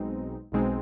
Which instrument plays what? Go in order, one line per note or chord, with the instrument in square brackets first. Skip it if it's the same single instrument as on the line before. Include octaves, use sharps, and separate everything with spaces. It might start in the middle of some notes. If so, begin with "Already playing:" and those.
Already playing: [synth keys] B1 B2 G#3 C4 D#4
B1 B2 G#3 C4 D#4